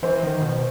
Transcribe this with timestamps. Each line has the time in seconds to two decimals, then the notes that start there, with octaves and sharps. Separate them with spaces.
0.03 E3 C5
0.23 D#3
0.41 B2